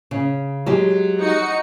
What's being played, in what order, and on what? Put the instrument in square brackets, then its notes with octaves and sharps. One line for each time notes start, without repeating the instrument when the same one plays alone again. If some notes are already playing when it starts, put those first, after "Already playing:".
[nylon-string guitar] C#3
F#3 G#3 G4
[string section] D#4 F#4 C#7